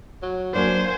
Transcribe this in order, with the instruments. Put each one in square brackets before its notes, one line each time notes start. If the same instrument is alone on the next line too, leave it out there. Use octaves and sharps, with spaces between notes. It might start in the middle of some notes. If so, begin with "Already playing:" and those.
[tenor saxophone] F#3
[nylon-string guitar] F#3 A3 A#3 [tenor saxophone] D4 [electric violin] C5 G#5